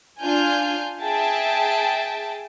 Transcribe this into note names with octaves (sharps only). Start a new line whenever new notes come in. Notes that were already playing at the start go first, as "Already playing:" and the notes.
D4 F4 G#5 F6 G6
G#4 E5 G5 A5